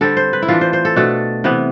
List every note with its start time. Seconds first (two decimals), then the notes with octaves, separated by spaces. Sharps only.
0.01 D3 G3 C4 A4
0.17 C5
0.33 B4
0.42 E4
0.48 E3 A3 D4 F4
0.61 C5
0.73 C5
0.85 A4
0.96 B2 A3 D4 A4
1.44 C3 E3 B3